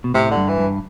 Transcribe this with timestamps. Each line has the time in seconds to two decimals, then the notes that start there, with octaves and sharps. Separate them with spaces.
0.04 B2
0.14 A2 C3
0.31 D3
0.37 G2
0.48 E3
0.59 G2